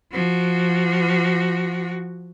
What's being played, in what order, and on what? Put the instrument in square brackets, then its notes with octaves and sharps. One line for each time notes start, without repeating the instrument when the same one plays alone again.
[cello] F3 F#4